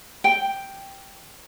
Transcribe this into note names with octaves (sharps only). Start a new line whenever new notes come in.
G5